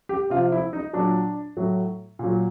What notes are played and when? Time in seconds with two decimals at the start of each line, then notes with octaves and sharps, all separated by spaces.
0.09 G4
0.30 C3 F3 F4
0.52 E4
0.73 D#4
0.93 A#2 F#3 D4
1.57 A2 F#3
2.19 A#2 F#3